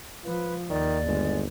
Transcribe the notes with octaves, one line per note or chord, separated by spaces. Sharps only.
F3 B4
D#2 D#3 D5
G1 G#3